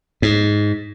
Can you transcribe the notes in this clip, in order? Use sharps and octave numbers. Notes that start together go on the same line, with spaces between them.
G#2